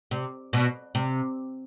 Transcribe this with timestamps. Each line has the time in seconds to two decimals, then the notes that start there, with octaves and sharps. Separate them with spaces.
0.11 C3
0.53 B2
0.95 C3